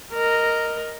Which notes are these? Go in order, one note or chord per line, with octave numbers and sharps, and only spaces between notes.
A#4 D#5